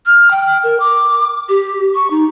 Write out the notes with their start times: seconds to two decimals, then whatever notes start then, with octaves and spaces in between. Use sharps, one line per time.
0.06 F6
0.31 G5
0.63 A#4
0.80 D6
1.49 G4
1.95 C#6
2.11 D#4